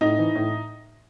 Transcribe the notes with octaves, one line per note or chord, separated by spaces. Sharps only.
A2 D#4
E3
A2